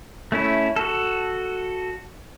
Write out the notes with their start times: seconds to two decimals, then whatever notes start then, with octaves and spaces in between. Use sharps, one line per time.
0.32 A3 C#4 E4
0.76 F#4 A4